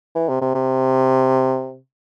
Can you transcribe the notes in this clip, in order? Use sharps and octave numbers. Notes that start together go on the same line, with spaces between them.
E3
C3
C3
C3